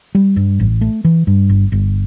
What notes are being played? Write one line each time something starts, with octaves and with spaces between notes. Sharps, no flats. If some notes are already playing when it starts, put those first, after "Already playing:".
G3
G2
A1
A3
E3
G2
G1
G1